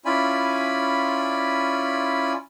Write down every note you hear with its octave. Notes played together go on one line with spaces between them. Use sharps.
C#4 E4 F4 D5 G#5 B5